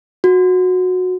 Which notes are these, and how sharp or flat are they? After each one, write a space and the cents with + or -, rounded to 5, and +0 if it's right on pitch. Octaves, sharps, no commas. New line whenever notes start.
F#4 -15